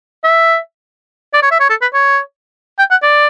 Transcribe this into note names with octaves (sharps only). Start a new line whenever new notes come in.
E5
D5
C#5
E5
C#5
A4
B4
C#5
G5
F#5
D5